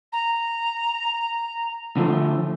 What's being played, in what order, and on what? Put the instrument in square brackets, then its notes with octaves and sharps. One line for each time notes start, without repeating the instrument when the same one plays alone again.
[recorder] A#5
[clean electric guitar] D3 F3 A3